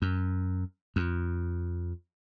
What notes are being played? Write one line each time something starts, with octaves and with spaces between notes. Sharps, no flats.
F#2
F2